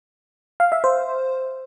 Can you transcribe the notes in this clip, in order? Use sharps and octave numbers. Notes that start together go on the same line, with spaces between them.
F5
E5
C5